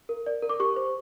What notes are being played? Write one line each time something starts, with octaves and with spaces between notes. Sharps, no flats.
A#4
D5
A#4
D6
G4 C#6
C5